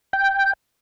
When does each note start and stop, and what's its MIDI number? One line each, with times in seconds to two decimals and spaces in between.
0.13 0.53 79